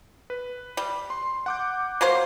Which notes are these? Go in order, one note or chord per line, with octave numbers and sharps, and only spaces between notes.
B4
G3
C6
F#5 D6 G6
F#3 A#3 C5